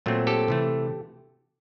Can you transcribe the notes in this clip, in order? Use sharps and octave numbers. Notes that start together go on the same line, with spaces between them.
A#2 F#3 A3 C4
G4 A4
C3 E3 A3